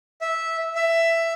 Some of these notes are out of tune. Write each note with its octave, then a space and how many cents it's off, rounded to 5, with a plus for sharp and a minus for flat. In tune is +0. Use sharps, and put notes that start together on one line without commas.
E5 -10
E5 +10